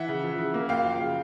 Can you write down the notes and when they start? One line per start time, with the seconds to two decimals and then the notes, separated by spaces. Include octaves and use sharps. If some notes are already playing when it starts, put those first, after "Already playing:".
Already playing: E3 E5 F#5
0.08 C#3
0.24 F3
0.38 C#3
0.54 A#3
0.69 F#2 F5 G5
0.85 F3
0.99 C#3